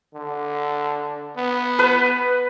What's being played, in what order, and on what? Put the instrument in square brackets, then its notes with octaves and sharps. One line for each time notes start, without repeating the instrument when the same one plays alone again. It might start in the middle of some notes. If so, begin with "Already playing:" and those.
[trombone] D3
B3
[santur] B4